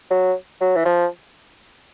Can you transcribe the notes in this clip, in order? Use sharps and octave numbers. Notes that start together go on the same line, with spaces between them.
F#3
F#3
E3
F3